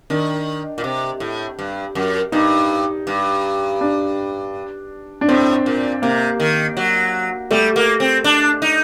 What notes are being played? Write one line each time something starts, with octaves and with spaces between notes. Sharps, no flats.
D#3 D4
A#2
C3
A2
G2
F#2
G2 D#4
G2
D4
D4
A2 C4
A#2
C3 A#3
D#3
F#3
G3 A3
A#3
C4
D4
D#4